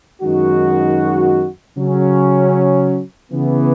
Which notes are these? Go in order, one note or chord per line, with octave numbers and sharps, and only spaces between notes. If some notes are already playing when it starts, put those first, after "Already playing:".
F#2 D#3 G#3 D#4 F#4
C#3 F#3 C#4
C#3 E3 B3